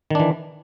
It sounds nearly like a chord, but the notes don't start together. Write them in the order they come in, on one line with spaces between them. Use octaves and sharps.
D#3 D4 E3